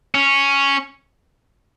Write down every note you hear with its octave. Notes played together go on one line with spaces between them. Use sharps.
C#4